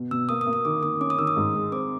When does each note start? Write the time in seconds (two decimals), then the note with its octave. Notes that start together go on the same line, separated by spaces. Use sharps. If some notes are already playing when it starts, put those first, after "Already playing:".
Already playing: B2
0.11 B2 E6
0.29 A#3 D#6
0.41 D#6
0.46 A#3
0.53 D#6
0.65 D#3 D6
0.83 D#3 D#6
1.00 C#4 D6
1.10 D#6
1.19 D#3 E6
1.27 D#6
1.37 G#2
1.55 G#3
1.72 C4 D6